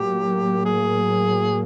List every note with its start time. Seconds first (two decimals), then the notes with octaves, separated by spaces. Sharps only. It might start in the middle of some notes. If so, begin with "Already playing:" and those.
Already playing: A2 F#3 A#3 G4
0.65 G#4